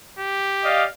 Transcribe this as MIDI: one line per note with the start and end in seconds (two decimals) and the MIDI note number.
0.19 0.87 67
0.64 0.85 74
0.64 0.85 75
0.64 0.85 77